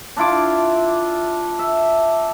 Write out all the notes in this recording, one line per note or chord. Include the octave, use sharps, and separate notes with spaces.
D4 E4 F4 D6
E5